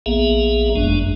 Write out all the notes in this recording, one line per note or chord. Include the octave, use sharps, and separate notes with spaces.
A#1 A#3 B3 G#4 E5
G1 F#2 G#3 D4